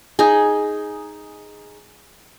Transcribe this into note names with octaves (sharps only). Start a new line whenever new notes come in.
D#4 G#4